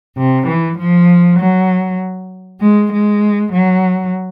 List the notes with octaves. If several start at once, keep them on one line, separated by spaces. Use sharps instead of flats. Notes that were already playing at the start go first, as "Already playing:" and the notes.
C3
E3
F3
F#3
G#3
G#3
F#3